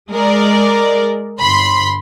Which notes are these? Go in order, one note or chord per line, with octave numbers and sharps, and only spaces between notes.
G#3 A#4 D5
G1 B5 C6